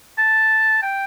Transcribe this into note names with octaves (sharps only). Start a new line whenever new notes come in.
A5
G5